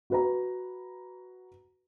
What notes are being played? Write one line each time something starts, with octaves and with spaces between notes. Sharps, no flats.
F#4 B4 A#5